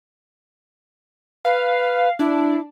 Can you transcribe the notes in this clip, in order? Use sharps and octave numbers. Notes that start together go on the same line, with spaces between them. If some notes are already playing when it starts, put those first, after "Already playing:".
B4 F5
D4 E4